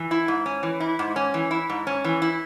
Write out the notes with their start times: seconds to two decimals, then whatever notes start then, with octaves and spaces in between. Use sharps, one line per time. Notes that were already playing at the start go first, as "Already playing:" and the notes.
Already playing: E3
0.11 E4
0.28 G#2
0.46 C#4
0.63 E3
0.80 E4
0.99 G#2
1.16 C#4
1.34 E3
1.51 E4
1.70 G#2
1.87 C#4
2.05 E3
2.22 E4